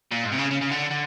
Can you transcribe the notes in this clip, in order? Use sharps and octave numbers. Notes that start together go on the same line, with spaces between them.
A#2
G#2
C3
C#3
C#3
C#3
D3
D3